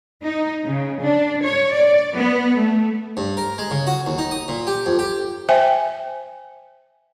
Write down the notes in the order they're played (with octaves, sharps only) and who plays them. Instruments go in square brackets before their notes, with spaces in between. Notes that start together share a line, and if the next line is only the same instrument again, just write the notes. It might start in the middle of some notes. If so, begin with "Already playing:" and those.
[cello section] D#4
C#3
D4
C#5
D5
B3
A3
[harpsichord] G2
A#4
G#3
C#3
F#4
D#2
D#4
D#6
A#2
G4
F2
G4
[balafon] C5 E5 G5 G#5